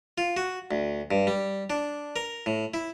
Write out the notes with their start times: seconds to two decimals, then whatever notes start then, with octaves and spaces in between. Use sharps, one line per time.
0.18 F4
0.37 F#4
0.71 D2
1.11 G2
1.27 G3
1.70 D4
2.16 A#4
2.46 A2
2.74 E4